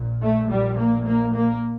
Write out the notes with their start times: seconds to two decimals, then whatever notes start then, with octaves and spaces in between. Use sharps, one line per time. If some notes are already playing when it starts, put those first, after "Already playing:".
Already playing: A#1 A#2
0.21 A3
0.50 A#1 A#2 G3
0.78 A#3
1.05 A#3
1.34 A#3